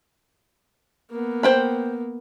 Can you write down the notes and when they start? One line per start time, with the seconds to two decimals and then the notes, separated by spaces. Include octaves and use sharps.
1.11 A#3 B3
1.43 C5 G5 B5